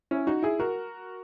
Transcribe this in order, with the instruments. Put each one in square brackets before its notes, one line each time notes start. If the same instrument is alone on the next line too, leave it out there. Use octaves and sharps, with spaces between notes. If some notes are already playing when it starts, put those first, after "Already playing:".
[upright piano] C#4 E4
D#4 F#4
E4 G#4
F#4 A#4